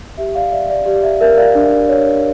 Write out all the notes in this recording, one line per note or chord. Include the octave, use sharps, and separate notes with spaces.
G4 E5
D5 F5
D5 E5
D5
G4 D5
E5
A#4 E5
D5 F5
D4
C#5